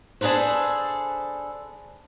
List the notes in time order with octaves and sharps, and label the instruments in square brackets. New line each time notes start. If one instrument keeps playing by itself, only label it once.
[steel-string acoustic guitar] D4 G#4 A4 B4 C5